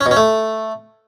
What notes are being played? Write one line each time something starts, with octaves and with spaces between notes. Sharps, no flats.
C#4
B2
C#4
A3